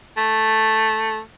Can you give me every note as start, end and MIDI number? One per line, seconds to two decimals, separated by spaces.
0.17 1.20 57